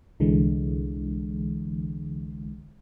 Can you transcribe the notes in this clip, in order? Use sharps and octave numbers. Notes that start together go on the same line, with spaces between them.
C2 D3 E3 G#3